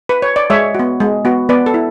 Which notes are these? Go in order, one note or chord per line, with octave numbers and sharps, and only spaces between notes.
B4
C#5
D5
G#3 C#5 E5
B3 F#4
G#3
B3 F#4
B3 B4 D5
A4
E4